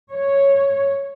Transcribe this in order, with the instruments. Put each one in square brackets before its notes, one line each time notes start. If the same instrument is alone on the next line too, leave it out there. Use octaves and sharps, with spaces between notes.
[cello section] C#5